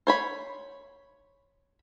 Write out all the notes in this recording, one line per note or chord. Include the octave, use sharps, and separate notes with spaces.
C5 C#5 B5